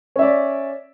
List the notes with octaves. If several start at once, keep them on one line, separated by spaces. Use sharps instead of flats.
C#4 D5 E5